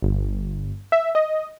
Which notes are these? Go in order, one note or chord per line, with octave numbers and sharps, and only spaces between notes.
G1
E5
D#5